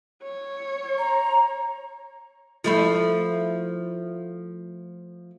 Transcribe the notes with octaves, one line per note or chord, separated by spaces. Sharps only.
C#5
A#5
F3 A3 E4